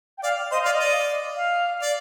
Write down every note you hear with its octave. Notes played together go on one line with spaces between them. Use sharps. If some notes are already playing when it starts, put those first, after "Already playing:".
G5
D5 F5
C5 D#5
D5 F5
D#5
D5
F5
D5